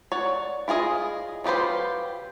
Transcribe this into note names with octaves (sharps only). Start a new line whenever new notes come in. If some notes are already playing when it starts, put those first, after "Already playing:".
C#5 D5 F#5
E4 F4 G#4 D#5
F#3 F4 G4 B4 C5